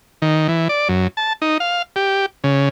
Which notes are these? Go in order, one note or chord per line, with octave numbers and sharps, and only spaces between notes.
D#3
E3
D5
F#2
A5
D#4
F5
G4
C#3